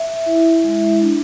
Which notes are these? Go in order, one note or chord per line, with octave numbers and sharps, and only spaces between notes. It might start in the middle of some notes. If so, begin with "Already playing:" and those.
Already playing: E5
E4
G#3
D4